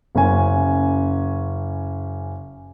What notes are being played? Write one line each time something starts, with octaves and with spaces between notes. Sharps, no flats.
F#1 C#4 G#5